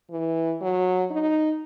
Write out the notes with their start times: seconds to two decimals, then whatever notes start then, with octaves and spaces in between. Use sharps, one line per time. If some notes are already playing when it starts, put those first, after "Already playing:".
0.11 E3
0.61 F#3
1.11 D#4